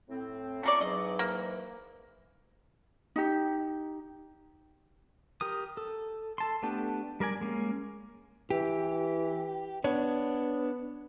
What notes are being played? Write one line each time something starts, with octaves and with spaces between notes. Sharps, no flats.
A2 C4
A3 A#3 C#4 F4 D5 C#6
G#2 E3 F#3 D#5
A#3
D#4 G4
G4 A#4 D#6
A4
A4 A5 C6
A3 B3 D4 G4 A4
G3 A#4 D5 G#5
G#3 A#3 C#4
E3 G4
B3 D4 C#5